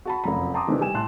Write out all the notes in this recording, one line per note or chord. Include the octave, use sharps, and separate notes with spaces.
F#4 A5 B5
F1 F#2 F3 A#5 B5
G5 A5 A#5 C6 D6 D#6
C3 D#3 E3 A3 C4 D4
G3 G5 G#5 E7
A2 A5 C6 F#6